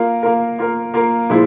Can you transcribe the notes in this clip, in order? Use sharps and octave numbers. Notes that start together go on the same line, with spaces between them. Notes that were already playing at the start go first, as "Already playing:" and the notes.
Already playing: A#3 F4 A#4
A#3 F4 A#4
A#3 F4 A#4
A#3 F4 A#4
A#2 F3 G#3 E4